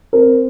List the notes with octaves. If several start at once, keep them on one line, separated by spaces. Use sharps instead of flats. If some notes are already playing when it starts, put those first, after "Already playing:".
C4 A#4